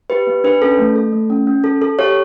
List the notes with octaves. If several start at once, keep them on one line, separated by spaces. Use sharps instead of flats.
G4 B4
B3
D4 B4
C#4 A4
A3
A4
A3
C#4
C#4
A4
A4
G4 C#5